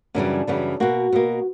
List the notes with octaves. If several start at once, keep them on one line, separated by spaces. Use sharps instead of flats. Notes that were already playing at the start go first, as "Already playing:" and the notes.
F#2 C#3 E3 G3 D4
F#2 C#3 E3 G3
B2 A#3 F#4
B2 A#3